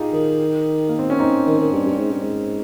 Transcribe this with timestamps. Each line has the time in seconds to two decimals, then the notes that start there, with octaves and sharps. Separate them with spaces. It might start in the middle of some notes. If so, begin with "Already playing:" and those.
Already playing: D#4 F4 G4 G#4
0.13 D#3
0.89 A#3
0.99 C4
1.10 C#4
1.19 C4 D#4
1.47 D#3
1.59 D#3
1.73 G2
1.86 G2
1.99 G#2
2.10 G2
2.22 G#2